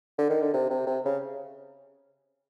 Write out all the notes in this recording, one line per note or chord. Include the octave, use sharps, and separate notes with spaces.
D3
D#3
D3
C3
C3
C3
C#3